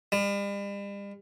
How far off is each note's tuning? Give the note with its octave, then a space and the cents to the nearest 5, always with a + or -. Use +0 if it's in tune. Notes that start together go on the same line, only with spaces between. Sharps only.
G3 +45